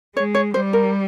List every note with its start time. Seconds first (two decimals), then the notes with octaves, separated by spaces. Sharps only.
0.16 G#3 C#5
0.35 C#5
0.54 G3 C5
0.73 A#4